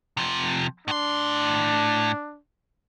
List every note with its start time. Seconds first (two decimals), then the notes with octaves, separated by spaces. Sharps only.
0.17 C3 F3
0.88 A2 D4 C6